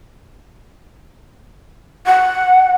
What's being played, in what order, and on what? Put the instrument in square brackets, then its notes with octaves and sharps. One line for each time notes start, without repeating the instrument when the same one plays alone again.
[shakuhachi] F#5